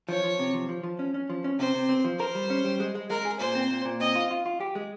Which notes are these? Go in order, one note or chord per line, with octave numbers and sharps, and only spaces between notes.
F3 C#5
F3
C3
F3
F3
F3
C#4
C#4
F3
C#4
C3 C5
C3
C4
F3
A#4 C5
G3
C#4
G3
G#3
G#3
G#3 A#4
G#4
A#2 C5
C4
A#2
A#2
C4 D#5
F4
F4
F4
G4
G#3